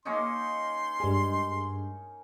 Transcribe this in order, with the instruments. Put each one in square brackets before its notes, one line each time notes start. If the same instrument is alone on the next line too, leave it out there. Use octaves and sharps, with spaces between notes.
[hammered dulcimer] A#3 C#4 D#4 [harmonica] C6
[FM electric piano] G2 G#3